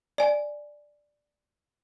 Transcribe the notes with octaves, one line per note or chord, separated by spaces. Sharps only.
D5 G#5